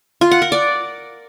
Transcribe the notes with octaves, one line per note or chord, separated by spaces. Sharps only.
F4
F#5
A#4
D5